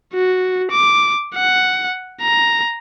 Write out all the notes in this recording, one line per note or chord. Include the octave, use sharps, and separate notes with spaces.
F#4
D6
F#5
A#5